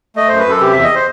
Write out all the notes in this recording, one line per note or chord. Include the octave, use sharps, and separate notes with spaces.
A3 D#5
F#2 C5
B4
F#2 A4
C3 G4
E2 E5
D#5
C5